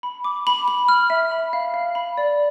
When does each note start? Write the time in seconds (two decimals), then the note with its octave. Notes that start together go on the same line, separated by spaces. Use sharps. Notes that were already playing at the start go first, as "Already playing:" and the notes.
0.03 B5
0.24 D6
0.47 B5
0.68 B5
0.88 F6
1.10 E5
1.31 B5
1.53 F5
1.74 F5
1.95 B5
2.17 D5